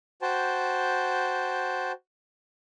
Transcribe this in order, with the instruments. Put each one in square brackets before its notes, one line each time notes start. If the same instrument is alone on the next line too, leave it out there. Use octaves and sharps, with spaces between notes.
[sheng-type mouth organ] F#4 C5 G5 A5